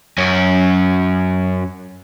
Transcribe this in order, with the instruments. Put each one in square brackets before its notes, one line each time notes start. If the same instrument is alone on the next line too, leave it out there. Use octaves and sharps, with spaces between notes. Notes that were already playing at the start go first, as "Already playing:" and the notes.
[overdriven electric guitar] F#2 C#4